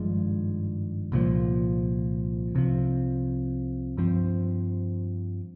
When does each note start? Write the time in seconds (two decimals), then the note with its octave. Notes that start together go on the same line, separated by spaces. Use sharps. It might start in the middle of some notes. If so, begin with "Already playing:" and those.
Already playing: G#1 G2 F3 G#3
1.12 C2 A#2 F3
2.55 C2 C3 F3
3.97 G2 F3 C4